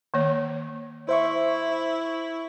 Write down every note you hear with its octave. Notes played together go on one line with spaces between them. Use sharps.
D#3 A#3 C#5
E4 C5 E5 C#6